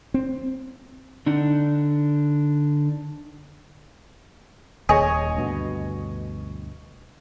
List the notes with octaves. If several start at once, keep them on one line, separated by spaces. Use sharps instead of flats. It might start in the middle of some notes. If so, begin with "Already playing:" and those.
C4
D3 D4 D#4 F#5
D#1 D#2 D#3 G#4 C#5 D#5 G#5
D2 G2 B2